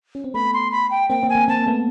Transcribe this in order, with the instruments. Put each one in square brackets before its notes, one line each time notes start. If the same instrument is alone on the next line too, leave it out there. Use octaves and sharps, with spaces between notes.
[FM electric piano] C#4
C4
[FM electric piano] A3 B3 [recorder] B5
[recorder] C6
B5
G5
[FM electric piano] A#3 C4 [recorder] G5
[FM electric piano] A#3 C4
[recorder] G#5
[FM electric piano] A#3 C4
[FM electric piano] A#3 C4 [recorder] A5
[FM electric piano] A3 B3